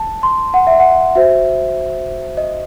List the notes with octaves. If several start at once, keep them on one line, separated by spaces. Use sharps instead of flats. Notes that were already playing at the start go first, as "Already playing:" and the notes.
Already playing: A5
C6
F#5
E5
F#5
F#4 C5 E5
D#5